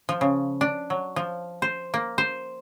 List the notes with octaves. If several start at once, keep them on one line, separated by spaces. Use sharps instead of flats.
F3
C#3
D4
F#3
F3
C5
A#3
C5